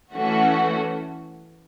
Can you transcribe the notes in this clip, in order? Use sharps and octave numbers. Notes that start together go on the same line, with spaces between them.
E3 A3 C#4 F#4 A4